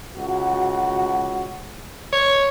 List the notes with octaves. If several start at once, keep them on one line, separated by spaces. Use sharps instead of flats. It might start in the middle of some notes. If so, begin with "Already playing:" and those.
C#2 F#4
C#5